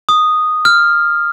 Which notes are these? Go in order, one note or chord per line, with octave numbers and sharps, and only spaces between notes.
D#6
F6